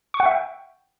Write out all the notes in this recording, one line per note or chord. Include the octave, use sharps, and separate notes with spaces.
C#6
F#5
E5
G5